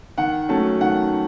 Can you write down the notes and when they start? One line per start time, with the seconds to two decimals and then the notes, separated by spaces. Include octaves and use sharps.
0.18 D#3 F#5
0.49 F#3 A3 C#4 A5
0.81 D#3 F#5